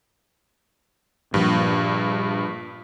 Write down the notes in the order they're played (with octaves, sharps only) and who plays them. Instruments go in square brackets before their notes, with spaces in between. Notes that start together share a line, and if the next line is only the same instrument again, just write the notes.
[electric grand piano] G2 [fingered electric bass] A#2 F3